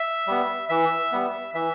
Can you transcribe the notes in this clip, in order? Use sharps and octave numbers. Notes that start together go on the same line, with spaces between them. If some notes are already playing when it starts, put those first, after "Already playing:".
Already playing: E5
G3 B3
E3 E5
G3 B3
E3 E5